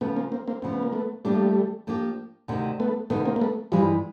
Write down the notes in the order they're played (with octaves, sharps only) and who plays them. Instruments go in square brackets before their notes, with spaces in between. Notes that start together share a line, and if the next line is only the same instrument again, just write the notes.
[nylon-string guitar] D2 C#3 F3 [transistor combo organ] A3 B3
[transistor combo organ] A#3 C4
A#3 C4
A#3 C4
[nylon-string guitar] D2 C#3 F3 [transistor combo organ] C4
[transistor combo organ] B3
A#3
A3 B3
[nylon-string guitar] F3 A#3 D4 G4 [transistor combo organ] G3 A3
[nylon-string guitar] F3 A#3 D4 G4
D2 C3 D#3
[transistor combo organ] A3 B3
[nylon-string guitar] D2 C3 D#3 [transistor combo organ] A3 B3
[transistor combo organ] A#3 C4
A#3
A3 B3
[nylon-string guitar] G2 E3 G#3 [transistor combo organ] F3 G3